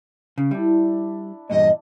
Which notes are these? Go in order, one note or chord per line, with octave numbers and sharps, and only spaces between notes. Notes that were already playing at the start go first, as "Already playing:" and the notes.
C#3
G3 D4 E4
E2 G2 A#2 D#5